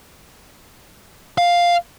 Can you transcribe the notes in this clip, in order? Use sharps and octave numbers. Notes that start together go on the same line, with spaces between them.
F5